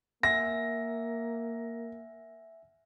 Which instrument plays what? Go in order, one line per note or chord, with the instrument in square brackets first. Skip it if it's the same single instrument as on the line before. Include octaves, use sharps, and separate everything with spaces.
[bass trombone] A#3 [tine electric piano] E5 F#5 G#5 [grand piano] A#6